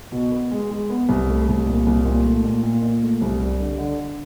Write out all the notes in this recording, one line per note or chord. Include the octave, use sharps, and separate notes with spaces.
B2
B3
G#3
G#3
B3
C2
A3
C2
A#2
C2
A#2
A3
A#2
A#2
A#2
A3
C2
G3
D3
D3
D3